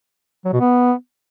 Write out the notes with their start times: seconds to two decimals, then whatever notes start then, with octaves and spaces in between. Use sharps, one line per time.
0.45 F#3
0.53 B2
0.61 B3